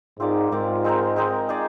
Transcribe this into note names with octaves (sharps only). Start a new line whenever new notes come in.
G#2 C4 F4 A#4 D5
G#2 C4 F4 A#4 D5
G#3 C4 D#4 A#4
G#3 C4 D#4 A#4
D#4 G#4 D5